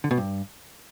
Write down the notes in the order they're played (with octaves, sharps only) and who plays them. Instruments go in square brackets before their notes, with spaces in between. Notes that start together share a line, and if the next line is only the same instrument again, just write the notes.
[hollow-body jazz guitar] D3
B2
G2